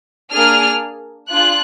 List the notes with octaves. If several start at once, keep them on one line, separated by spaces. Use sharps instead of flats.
A#3 D4 G#4 F6
D4 F4 G#4 F#6